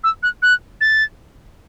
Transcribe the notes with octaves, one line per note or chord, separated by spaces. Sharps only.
E6
F#6
F#6
A6